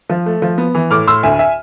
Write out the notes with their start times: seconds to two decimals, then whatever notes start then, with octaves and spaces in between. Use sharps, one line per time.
0.09 F3
0.26 A3
0.42 F3
0.58 B3
0.75 E3
0.90 A2 D6 F6
1.07 A2 C6 E6
1.23 D2 E5 G#5
1.39 E5 G#5